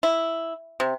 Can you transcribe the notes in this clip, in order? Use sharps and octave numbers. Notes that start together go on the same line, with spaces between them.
E4
C3